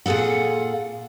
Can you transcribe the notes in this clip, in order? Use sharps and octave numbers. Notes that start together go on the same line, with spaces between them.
A#2 F4 G#4 A4 F#5